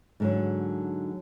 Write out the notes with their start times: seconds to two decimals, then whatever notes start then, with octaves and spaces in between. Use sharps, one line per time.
0.20 G#2 D3 F#3